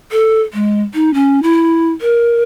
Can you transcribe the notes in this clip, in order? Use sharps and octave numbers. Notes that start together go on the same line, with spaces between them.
A4
G#3
D#4
C#4
E4
A#4